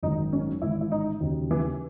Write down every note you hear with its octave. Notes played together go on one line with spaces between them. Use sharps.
G#1 F#2 D#3 D#4
C#4
A1 G#2 D#3 E4
E4
D#4
D#2 C#3 F#3
E3